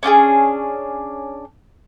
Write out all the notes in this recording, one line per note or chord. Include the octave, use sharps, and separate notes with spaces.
C#4 D4 F4 G#4